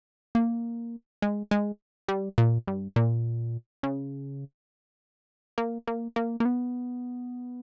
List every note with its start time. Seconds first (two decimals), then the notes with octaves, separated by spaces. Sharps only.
0.35 A#3
1.22 G#3
1.51 G#3
2.08 G3
2.38 A#2
2.68 G2
2.96 A#2
3.83 C#3
5.58 A#3
5.87 A#3
6.16 A#3
6.40 A#3
6.45 B3